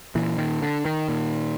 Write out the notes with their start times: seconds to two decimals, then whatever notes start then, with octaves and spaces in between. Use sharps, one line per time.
0.15 A#2 E3
0.38 D#3
0.62 D3
0.85 D#3
1.09 A#2